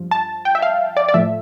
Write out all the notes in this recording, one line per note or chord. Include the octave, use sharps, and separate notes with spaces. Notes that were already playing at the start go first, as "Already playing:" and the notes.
Already playing: G2 F3
A5
G5
E5
F5
D5
D5
A2 F3 A3 E5